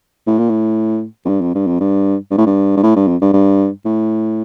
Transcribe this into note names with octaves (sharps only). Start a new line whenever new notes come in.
A2
A#2
A2
F2
G2
F2
G2
F2
G2
G2
A2
G2
G2
A2
G2
F2
G2
G2
A2